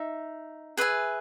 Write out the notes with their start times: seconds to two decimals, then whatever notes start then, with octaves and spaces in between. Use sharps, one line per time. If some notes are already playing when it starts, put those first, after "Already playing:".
Already playing: D#4 E5
0.77 G#4 B4 E5 G#5